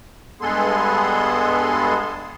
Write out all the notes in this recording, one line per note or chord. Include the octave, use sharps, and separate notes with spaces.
G2 G#3 B3 G#4 A4 C6